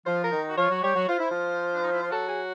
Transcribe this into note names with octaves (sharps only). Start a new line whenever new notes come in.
F3 F4 C5
A#4
D#3 D#4
F#4
F3 F4 C#5
F#3 F#4
G3 G4 C#5
F#3 F#4
F4 C5
E4
F3 F4
D4
D#4
E4
F4
F#3 F#4 A4
G#4